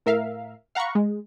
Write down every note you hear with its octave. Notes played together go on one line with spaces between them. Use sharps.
A2 A#4 E5 F5
F5 F#5 A#5 B5 C#6
G#3